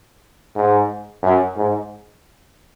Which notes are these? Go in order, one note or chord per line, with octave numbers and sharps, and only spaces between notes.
G#2
F#2
G#2